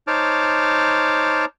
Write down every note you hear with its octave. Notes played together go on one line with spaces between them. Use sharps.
D#4 C5 C#5 A5 D6 F6